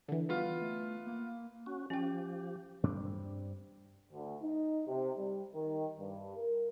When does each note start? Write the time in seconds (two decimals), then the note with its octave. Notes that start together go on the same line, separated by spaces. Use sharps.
0.08 D3 E3
0.29 G3 B3 F4
0.61 A3
1.06 A#3
1.66 C#4 F#4
1.90 F3 C#4 G4 G5
2.83 G2 G3 C4 D4
4.12 D2
4.43 D#4
4.88 C3
5.17 G3
5.55 D#3
5.99 G2
6.36 A#4